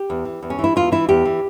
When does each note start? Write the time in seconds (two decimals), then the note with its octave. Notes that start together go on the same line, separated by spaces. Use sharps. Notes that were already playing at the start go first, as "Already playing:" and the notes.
Already playing: G4
0.10 E2
0.25 E3
0.42 E2
0.50 C#4
0.59 E3
0.64 E4
0.76 E2 F4
0.92 E3 E4
1.09 E2 G4
1.25 E3